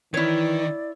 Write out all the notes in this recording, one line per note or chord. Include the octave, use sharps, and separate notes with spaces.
D#3 E3 E4 C#5 D5